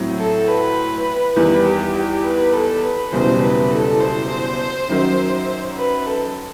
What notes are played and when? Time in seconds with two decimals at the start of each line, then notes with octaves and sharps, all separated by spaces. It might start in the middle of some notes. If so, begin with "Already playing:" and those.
Already playing: A2 F#3 C4
0.19 A4
0.47 B4
1.35 E2 D#3 G3 B4
1.65 G4
1.94 G4
2.24 B4
2.53 A4
2.83 B4
3.12 F#1 E2 B2 G3 C5
3.41 B4
3.71 A4
4.01 C5
4.88 F#2 D#3 F#3
5.76 B4
6.06 A4